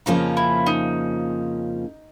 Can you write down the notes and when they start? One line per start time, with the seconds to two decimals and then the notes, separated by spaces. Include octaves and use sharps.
0.06 F2 C#3 F3 A#3 C#4 D#4
0.37 E4
0.66 D#4